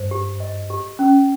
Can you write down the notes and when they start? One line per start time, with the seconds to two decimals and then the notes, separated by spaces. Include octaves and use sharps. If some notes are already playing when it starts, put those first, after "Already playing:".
Already playing: G2 C5
0.11 G4
0.40 D#5
0.70 G4
0.99 C#4